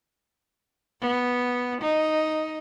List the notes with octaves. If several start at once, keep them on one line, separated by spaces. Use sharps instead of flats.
B3
D#4